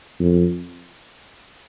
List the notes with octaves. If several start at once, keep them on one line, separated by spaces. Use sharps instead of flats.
F2